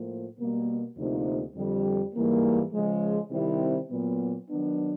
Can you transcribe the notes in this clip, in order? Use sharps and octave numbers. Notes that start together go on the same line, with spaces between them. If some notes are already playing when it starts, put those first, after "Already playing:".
Already playing: A2 F3 A#3
B2 G3 A#3
D2 C3 F3 A#3 D#4
F2 D3 G3
G#2 E3 G3 A#3
C#3 F3 G#3
C3 D#3 G3 C4 E4
A#2 F#3 B3
D#3 F#3 B3 D4